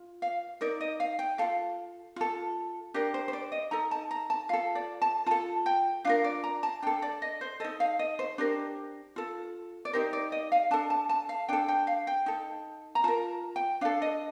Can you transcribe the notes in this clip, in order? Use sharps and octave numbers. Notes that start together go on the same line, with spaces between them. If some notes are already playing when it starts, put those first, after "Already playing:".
Already playing: F4
F5
D#4 A#4 D5
D#5
F5
G5
F4 A4 F5
F4 A4
D4 G4 A#4 D5
C5
C5
D5
D#5
D#4 A4 A#5
A5
A#5
A5
F4 A4 F5
D5
A5
F4 A4 A5
G5
D4 F4 A#4 F5
D5
A#5
A5
D4 A4 G5
D5
D#5
C5
D#4 A4 D#5
F5
D#5
C5
D4 G4 A#4
F4 A4
D5
D#4 G4 A#4 C5
D5
D#5
F5
D4 A4 A5
A5
A5
F5
D4 A4 G5
G5
F5
G5
D#4 A4
A#5
F4 A#4 A5
G5
D4 A4 F5
D#5